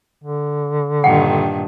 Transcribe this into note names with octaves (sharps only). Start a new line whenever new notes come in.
D3
G2 A#2 D#3 F#5 G5